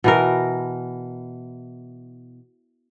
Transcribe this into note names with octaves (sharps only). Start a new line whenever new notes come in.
B2 E3 A#4